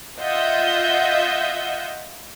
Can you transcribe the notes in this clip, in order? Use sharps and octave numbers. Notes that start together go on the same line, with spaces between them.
F4 D#5 E5 F#5 G6